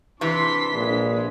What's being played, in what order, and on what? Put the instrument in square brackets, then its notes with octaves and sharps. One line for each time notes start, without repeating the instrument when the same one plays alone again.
[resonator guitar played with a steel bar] C3 E3 [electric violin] D4 B6 [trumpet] C6
[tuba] A#1 [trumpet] G#3